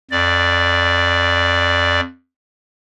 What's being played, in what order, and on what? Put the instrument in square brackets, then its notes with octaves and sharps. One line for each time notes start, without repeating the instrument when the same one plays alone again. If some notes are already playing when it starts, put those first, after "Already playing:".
[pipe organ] F2 D5